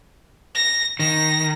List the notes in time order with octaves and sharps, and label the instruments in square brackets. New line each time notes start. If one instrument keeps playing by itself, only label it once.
[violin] A#6
[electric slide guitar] D#3 [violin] A#6